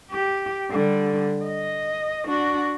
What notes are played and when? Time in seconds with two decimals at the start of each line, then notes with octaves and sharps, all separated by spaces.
0.11 G4
0.70 D3 G3
1.45 D#5
2.27 D4 F#4